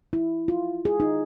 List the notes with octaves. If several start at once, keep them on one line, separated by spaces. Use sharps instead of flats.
E4
F4
G#4
D#4